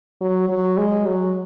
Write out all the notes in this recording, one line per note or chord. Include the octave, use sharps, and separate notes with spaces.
F#3
F#3
G#3
F#3